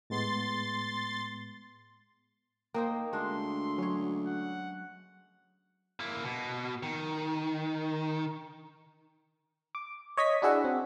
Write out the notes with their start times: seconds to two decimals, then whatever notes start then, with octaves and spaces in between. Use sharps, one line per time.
0.10 A2 G#3 B3 C6 A6
2.74 A#3 D#4 C5 G5
3.13 D2 G#3 D4 C6
3.78 F#3 C#4 C#5
4.27 F#5
6.00 A#3 E4
6.24 B2
6.83 D#3
9.75 D6
10.17 C#5 D#5 G#6 B6
10.42 D4 E4 F#4 G#4 E5 F#5
10.64 C4